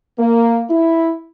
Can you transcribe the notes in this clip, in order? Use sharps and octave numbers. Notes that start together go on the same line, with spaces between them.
A#3
E4